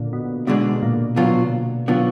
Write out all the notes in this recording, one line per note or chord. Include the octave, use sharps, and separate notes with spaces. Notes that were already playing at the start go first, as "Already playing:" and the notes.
Already playing: A#2 D3
B2
D2 B2 D3 G#3 D4
A#2
D2 D3 F#3 B3 F4
D3 F#3 B3 F4